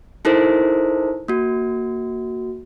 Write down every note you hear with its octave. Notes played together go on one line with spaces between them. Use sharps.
D#4 E4 A4 A#4 C5
A#3 F#4